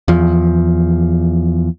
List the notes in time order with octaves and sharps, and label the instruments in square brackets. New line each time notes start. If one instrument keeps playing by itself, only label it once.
[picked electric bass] E2 F3